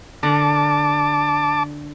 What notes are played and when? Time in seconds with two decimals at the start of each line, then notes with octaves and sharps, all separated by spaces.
0.23 D3 A#4 F#5 A5 D6